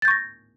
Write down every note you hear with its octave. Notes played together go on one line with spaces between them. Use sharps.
C#6 G6 A6 A#6